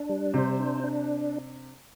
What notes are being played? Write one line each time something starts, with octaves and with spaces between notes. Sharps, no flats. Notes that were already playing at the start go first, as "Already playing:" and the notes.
Already playing: D4
G3
C3 C5
D4
D4